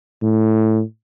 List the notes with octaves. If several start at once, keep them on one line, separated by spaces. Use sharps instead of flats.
A2